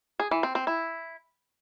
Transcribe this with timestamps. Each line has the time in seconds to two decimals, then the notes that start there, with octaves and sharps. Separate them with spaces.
0.20 G#4
0.31 E3
0.43 C4
0.55 C4
0.67 E4